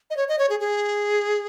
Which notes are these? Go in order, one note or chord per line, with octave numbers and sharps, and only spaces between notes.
D#5
C#5
D#5
C#5
G#4
G#4